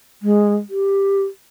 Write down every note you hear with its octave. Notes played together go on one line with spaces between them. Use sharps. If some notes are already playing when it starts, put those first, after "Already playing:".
G#3
G4